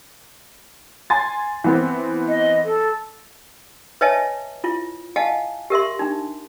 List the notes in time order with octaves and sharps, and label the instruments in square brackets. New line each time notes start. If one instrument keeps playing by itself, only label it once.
[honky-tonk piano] G#5 C6 A6
E3 B3 C4
[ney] D#5
A4
[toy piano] B4 C#5 D#5 E5 G#5 A5
E4 F4
D#5 F5 F#5 G#5 A5
G4 A#4 E5 C6
D4 D#4